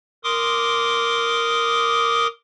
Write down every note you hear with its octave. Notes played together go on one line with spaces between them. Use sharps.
A#4 C6 D6 D#6